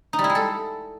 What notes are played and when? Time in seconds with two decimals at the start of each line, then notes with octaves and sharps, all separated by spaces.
0.13 D#4
0.19 G3
0.24 E4
0.30 G#3
0.35 A4